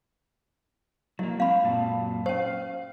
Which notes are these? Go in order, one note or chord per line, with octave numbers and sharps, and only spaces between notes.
F#3 A#3 E4
G#3 C4 F5 B5
F#2 A#2 A5
C#4 C5 F5